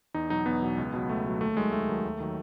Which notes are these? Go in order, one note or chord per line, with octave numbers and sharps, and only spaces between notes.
E2 D#4
B2 F#3 D#4
E2 B3
B2 F#3
C#2
B2 F#3
C#2 A3
B2 F#3
D#2 A3
D#3 F#3 G#3
D#2 A3
D#3 F#3
D#2
D#3 F#3